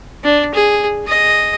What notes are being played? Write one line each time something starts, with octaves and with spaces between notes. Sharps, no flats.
D4
G#4
G#4 D#5